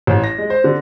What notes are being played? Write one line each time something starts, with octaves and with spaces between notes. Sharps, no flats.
A1
A#6
G#3
C5
D3